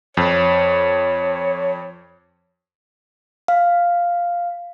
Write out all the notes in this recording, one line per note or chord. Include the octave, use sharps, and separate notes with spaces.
F2 C#5
F5